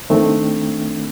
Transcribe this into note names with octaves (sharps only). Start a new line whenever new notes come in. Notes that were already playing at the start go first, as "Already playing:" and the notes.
D#3 A3 C4 D4